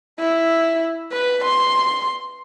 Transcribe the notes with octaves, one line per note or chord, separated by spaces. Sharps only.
E4
B4
C6